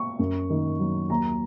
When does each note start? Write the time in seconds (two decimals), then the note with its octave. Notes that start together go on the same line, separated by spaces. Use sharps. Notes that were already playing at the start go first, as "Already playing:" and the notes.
Already playing: C#6
0.19 F#2
0.50 D#3
0.79 F#3
1.10 D#2 A#5